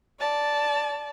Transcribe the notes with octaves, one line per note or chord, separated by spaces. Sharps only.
D5 A5